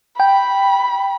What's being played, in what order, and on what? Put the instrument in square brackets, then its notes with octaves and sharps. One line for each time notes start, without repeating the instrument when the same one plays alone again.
[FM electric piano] G5 [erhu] B5